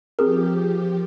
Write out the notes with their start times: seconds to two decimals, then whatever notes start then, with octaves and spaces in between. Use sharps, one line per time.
0.19 F3 C4 G4 G#4 A#4